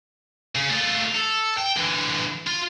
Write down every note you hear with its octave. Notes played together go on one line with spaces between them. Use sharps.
C#3
A3 F4
A4
G5
D3 E3
F4